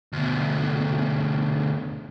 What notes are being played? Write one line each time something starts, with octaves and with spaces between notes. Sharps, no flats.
D2 B2